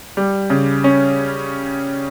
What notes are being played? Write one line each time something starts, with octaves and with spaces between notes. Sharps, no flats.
G3
C#3
C#4